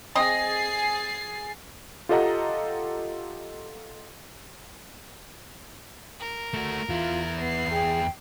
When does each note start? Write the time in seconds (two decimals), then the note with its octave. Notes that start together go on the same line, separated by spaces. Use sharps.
0.15 C4 G#4 D#5 A6 C7
2.09 F4 G4 A4 D#5 F#5 A#5
6.20 A#4
6.54 A3 F#4
6.89 E2 E4 F4
7.41 B3 C7
7.71 G#4 G5